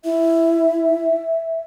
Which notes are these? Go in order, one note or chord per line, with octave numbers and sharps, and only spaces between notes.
E4 E5